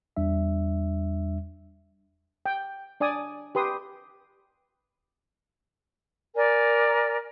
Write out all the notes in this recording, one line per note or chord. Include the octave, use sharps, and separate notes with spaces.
E2 G3 D4 E5
G5
D4 D5 G#5 D#6
G4 B4 C6 D#6
A#4 D5 G#5